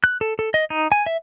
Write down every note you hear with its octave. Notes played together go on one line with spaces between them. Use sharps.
F#6
A4
A4
D#5
D#4
G#5
E5